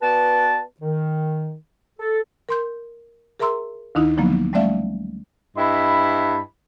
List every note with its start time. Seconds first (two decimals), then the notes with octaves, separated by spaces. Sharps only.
0.02 B3 F#4 B4 D5 A5
0.81 D#3
1.99 A4
2.49 A#4 C6 G6
3.39 G#4 A#4 E5 A#5 C6 E6
3.95 D2 D#3 D#4 E4
4.17 D3 F3 F#3 A#3 B3
4.53 G3 A3 C#4 D5 E5 F5
5.57 G2 E4 D#5 B5